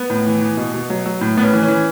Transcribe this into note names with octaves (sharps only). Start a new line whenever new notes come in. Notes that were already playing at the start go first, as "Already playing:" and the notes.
Already playing: B3
A2
E3
E3
B2
B2
F#3
F#3
A2
A2 B3
C#4
E3
C#4
E3